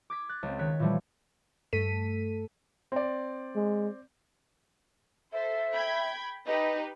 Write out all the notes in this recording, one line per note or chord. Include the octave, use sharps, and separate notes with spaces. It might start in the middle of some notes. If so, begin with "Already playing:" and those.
D6 G#6 B6
F#6 A6
C#2 C4
D#3 C#5 F#6 B6
A#2 E3 F3 G3 A3
G2 A3 A4 B6 D#7
C4 D5
G#3
A4 C5 E5
G5 B5 G#6
D#4 G4 B4 D#5